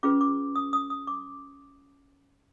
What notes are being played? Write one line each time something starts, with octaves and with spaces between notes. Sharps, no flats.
C#4 F4 G#4 B4 D6
D6
D#6
D#6
D#6
D6